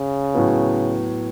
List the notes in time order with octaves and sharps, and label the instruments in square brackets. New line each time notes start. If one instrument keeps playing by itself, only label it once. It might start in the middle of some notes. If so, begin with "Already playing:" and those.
Already playing: [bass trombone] C#3
[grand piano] A2 F#3 B3